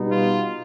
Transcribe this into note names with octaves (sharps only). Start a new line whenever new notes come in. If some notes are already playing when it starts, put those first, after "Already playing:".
Already playing: B2 G3 B3 D#4
F4